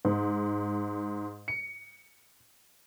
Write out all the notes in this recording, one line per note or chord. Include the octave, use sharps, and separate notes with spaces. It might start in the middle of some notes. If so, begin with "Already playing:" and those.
G#2
C#7